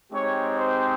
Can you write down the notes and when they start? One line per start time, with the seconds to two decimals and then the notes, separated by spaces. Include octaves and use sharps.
0.13 G#3 C4 D#4 G4 C#5
0.58 C5